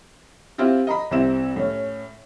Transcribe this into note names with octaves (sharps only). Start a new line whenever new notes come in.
C4 E4 F4 G4
D#5 A#5 B5
C2 C4 E4 E7
A2 C#4